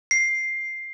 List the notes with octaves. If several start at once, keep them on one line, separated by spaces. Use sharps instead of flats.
C7